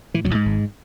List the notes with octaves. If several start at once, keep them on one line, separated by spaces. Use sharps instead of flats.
A2 E3
F#2 F#3
A1
G#2 G#3
G#1